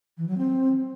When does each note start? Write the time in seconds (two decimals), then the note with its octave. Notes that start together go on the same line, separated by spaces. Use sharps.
0.17 E3
0.27 F#3
0.37 C4